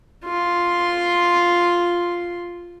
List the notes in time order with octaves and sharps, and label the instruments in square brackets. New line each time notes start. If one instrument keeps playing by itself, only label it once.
[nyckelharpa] F4 C6